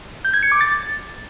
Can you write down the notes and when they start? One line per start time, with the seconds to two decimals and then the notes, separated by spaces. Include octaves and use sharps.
0.25 G6
0.34 G#6
0.43 C#7
0.52 D6
0.61 A6